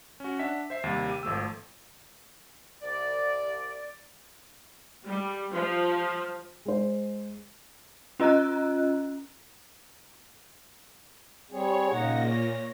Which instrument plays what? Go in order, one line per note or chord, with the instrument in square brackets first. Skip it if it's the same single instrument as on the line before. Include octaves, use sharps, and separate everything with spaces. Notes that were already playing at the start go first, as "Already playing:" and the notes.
[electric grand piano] C#4 F#4
D4 E5 F#5 B6
C5 E5 C7
D#2 C3 G3
G4 D#7
G#1 F3 A3 E6
[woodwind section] C2 D5
[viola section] G3
F3
[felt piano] G#3 C5
[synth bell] C#4 F4 D#5 A#5 F#6
[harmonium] G3 C4 G#4 [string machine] C#5
[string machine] A#2 A#6 [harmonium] C#3 D#4 F#5
[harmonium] C#5